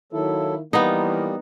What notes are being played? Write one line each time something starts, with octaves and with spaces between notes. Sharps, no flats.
D#3 F#3 A#3 E4 A4
E3 F3 G3 A#3 B3 D#4